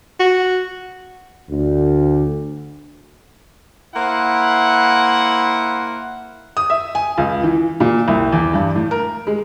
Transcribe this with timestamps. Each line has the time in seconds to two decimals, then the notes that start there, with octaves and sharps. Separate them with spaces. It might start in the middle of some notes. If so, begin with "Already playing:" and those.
0.20 F#4
1.50 D2
3.95 A#3 E4 C5 F#5
6.57 D#6
6.70 E5
6.95 G#5
7.18 C#2
7.43 E3
7.80 A#2
8.08 C2
8.33 E2
8.53 G2
8.75 A2
8.91 A#4
9.27 G#3